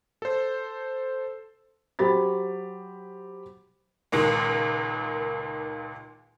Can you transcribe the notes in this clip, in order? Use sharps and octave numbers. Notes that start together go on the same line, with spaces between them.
A4 C5
F#3 G4 C5 B5 A6
C#2 A#2 D#3 G#3